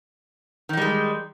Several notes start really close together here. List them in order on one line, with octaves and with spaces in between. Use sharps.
D#3 D#4 G3 G#3